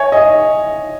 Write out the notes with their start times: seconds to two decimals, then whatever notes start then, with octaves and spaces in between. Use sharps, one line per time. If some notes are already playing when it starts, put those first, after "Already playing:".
Already playing: C#5 E5 G#5
0.12 D#5